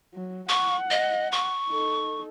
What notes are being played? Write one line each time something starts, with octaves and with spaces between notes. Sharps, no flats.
F#3
F#5 C#6
D#5
C#6
D#4 A4